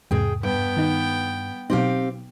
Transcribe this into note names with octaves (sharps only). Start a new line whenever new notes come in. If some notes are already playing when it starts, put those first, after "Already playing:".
E2 G#2 C3 G#4 G5
G2 B3 G5
D#3 D#4 G6
B2 F#3 C4 D#4 G4 F5